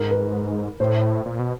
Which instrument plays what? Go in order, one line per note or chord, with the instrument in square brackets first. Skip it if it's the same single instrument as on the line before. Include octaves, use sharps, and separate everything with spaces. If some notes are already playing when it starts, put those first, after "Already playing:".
Already playing: [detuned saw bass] G#2 [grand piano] A#4
[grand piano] B4
[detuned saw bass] A2 [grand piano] C5
[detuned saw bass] A#2
B2